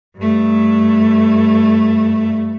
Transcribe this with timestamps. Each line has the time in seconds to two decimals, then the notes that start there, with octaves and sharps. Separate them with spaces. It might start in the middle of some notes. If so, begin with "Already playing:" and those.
0.17 G2 A3